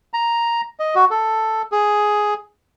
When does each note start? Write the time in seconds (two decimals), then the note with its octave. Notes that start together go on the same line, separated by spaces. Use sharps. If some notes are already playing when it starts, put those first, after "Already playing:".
0.14 A#5
0.80 D#5
0.95 F#4
1.11 A4
1.72 G#4